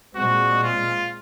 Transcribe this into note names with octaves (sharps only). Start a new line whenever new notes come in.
A#2 G#3 C4 F#4
F4